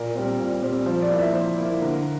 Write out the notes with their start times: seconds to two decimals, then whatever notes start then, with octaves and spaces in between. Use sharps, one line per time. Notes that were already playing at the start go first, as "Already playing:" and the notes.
Already playing: A#2 A#4
0.15 G3 C4
0.39 A#2
0.63 G3 C4
0.86 F3 C5
1.02 D5
1.10 A#3 E4
1.18 E5
1.34 F3 C5
1.57 A#3 E4
1.82 D3 A#4